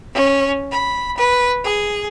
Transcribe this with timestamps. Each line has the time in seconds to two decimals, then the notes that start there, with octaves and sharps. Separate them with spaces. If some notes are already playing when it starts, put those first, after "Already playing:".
0.14 C#4
0.70 B5
1.17 B4
1.63 G#4